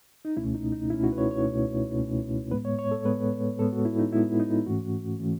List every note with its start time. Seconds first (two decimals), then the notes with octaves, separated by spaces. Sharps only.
0.25 D#4
0.36 C#2 B2 A3 C#4 E4
0.55 D#4
0.72 D#4
0.90 C#2 B2 A3 C#4 E4
1.04 F#4
1.13 B4
1.18 C#5
1.31 C#5
1.44 C#2 B2 A3 C#4
1.98 C#2 B2 A3 C#4
2.51 A2 G#3 B3 B4
2.65 C#5
2.79 C#5
2.91 A4
3.05 A2 G#3 B3 B4
3.59 A2 G#3 B3 A4
3.72 F#4
3.85 E4
3.99 D#4
4.12 A2 G#3 B3 E4
4.40 D#4
4.66 G#2 E3 A3 C#4 F#4
5.19 E3 A3 C#4